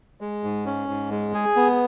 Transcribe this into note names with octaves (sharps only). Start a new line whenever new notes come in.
G#3
G#2
C#4
G#2
G#3
G#4
B3